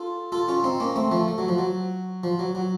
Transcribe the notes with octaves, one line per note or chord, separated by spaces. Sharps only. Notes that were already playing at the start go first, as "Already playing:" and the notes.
Already playing: F4 A4
F4 A4
C#4 F4
C4 D#4
A#3 C#4
A3 C4
F3 A3
A3
F#3
F3
F#3
F3
F#3
F#3